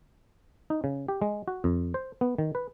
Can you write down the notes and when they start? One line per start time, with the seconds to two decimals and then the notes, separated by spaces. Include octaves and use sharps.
0.70 D#4
0.84 C#3
1.08 G4
1.22 G#3
1.48 F#4
1.64 F2
1.94 C5
2.21 B3
2.38 D#3
2.55 B4